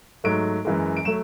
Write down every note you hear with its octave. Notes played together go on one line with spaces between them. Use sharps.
G#2 F#3 A3 D7
F#2 E3 G#3
D7
F#3 A3 E7